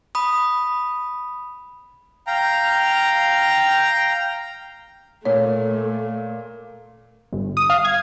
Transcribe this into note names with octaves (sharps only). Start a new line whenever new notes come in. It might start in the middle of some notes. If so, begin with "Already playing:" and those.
B5 D#6
F5 G5 A#5
A#2 A3 C#5
G1
D#6
F5
G#6